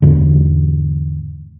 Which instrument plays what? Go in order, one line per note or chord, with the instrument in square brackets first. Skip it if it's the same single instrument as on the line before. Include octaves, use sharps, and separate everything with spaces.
[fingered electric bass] E2 G#2 D3